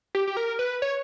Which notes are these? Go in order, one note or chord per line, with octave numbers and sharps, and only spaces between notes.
G4
G4
A#4
B4
C#5